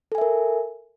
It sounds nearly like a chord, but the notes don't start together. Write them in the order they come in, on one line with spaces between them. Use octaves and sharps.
A4 G#5 E5 A#4